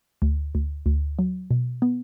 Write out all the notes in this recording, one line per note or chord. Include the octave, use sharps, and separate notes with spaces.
D2
D2
D2
F#3
B2
B3